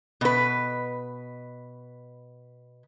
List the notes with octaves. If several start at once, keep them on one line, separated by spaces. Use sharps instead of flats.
B2 B4